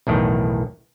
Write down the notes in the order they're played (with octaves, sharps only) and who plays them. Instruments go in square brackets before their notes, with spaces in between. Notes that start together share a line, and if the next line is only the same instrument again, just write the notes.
[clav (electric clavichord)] B1 E2 A2 D#3